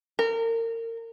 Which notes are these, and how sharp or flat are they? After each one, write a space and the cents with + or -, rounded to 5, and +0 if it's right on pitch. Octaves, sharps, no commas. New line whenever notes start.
A#4 -30